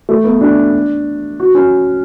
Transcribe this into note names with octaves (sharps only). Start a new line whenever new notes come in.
A3
B3
D4
F#4
C#4